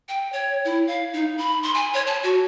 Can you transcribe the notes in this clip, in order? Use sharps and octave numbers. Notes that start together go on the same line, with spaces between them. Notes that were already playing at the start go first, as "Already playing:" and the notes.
G5
C#5
E4
F5
D#4
B5
C6
G#5
C#5
A5
F#4